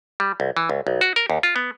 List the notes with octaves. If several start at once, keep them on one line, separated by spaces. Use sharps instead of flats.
G3
C2
E3
C#2
B1
F#4
A#4
D#2
F4
B3